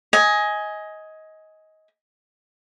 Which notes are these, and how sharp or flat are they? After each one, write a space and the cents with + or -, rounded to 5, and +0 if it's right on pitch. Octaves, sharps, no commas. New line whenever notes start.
D#5 +20 G#5 +5